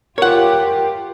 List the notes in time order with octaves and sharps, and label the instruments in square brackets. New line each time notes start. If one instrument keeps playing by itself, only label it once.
[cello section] F4 G4 [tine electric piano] A#4 [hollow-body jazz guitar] C#5 F#5